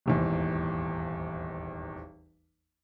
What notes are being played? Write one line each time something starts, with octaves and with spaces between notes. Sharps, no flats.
D#1 G#1 E2